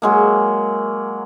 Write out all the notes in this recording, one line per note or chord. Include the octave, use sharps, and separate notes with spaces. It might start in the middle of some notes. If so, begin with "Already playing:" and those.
F#3 G#3 A#3